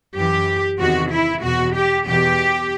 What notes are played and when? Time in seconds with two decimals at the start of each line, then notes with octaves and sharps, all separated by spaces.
0.16 F#2 E3 G4
0.80 E2 C3 D#3 F#4
1.11 E4
1.42 E2 B2 F#4
1.74 G4
2.06 E2 B2 G4